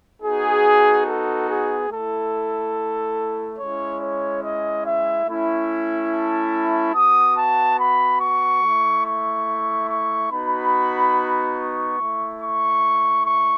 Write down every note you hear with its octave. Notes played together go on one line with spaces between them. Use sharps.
B3 D#4 F#4 G#4
A4
G#4
A3 E4 A4
G#3 C#4 E4 C#5
C#5
D#5
E5
A3 C#4 E4
A5
B3 F#4 D#6
A5
B5
C#6
A3 E4
C#6
C#6
B3 D#4 F#4 B5
C#6
A3 E4
C#6
C#6